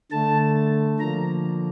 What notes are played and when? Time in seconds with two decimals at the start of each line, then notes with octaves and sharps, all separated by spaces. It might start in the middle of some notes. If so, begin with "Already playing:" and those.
0.12 D3 A3 A5
0.99 D3 F3 A#3 A#5